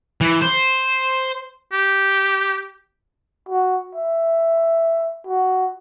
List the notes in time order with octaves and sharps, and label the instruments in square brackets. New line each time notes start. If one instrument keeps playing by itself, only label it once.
[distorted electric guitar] E3
C5
[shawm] G4
[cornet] F#4
E5
F#4